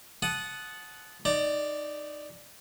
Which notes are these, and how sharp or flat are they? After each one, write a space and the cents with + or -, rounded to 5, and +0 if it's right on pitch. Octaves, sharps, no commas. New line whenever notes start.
F#5 +0 A5 -20 D#6 +0
D#4 -10 D5 +0 A#5 -45